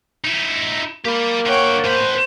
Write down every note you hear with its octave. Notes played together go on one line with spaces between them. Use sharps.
D#4 E4
A#3 G4 B5
D3 C#5 F#5 G5
A2 B4 C5